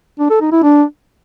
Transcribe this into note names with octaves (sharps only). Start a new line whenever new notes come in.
D4
A4
D#4
E4
D4